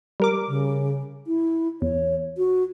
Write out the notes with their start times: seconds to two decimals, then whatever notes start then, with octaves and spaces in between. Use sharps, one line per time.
0.20 G3 A#4 D6
0.48 C#3
1.27 E4
1.82 E2 C#5
2.38 F#4